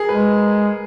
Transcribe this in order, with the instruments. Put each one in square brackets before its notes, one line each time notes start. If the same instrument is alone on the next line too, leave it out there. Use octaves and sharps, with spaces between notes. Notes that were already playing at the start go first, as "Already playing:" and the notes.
Already playing: [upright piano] G#4 A#4
[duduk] G#3 [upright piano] B4